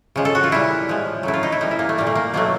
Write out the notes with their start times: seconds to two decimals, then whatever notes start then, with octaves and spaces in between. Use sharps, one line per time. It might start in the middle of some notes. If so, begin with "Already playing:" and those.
0.16 C#3 F3 G#3
0.25 A4
0.35 F#4
0.44 F4
0.52 A#2 G3 E4
0.89 A2 F3 G#3
1.23 C#3 F#3 A3 E4
1.34 F4
1.43 D#4
1.52 E4
1.61 C3 E3 G3 D#4
1.71 E4
1.79 A#3
1.89 A3
1.98 A#2 G3 A#3
2.07 A3
2.15 A#3
2.34 B2 F#3 A3 A#3